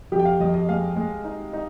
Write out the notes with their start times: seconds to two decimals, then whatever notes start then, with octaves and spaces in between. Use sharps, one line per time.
0.12 F2 G4
0.20 G5
0.25 F5
0.40 F2 D#5
0.54 D#5
0.69 G#3 F5
0.96 G#3
1.24 D#4
1.53 D#4